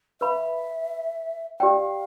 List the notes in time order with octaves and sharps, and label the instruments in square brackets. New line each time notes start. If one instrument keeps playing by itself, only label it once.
[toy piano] B4 F5 B5 [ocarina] E5
[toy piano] G4 D5 G5 [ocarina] F5